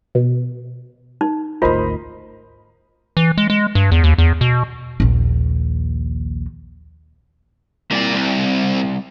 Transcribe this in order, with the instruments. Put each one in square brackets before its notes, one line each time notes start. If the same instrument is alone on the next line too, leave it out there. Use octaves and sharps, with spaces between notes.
[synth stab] B2
[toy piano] D#4
[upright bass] G#1 D2 [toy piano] F4 [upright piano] A#4 D#5 B5 [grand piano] C5
[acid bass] E3
G#3
G#3
G2
E2
D#2
E2
B2
[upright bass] A#1 D#2
[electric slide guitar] G3 C4 E4 [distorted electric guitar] A#3 D5
[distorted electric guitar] C2